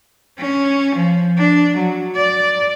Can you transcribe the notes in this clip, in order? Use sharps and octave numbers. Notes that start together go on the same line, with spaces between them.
C#4
F3
D4
F#3
D5